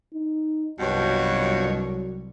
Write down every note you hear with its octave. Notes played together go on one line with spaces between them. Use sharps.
D#4
C2 G2 B2 F3 F#3 C#5